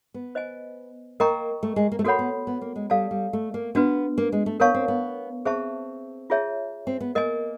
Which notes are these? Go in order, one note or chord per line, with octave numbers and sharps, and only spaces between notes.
B3
C5 D#5 G#5
A#3 A#4 D#5 G5 A#5 C#6
A3
G#3
A#3
A3
A#3 F#4 A4 C#5 F#5 B5
B3
B3
A#3
G#3
G3 A4 D5 F5 A5
G3
A3
A#3
B3 D4 F#4 B4
A#3
G#3
A3
B3 A#4 C#5 F5 A5 C#6
C4
B3
C4 G#4 C5 E5 A5 C#6
F4 G#4 C#5 E5 A5
C4
B3
A#3 A#4 D#5 G#5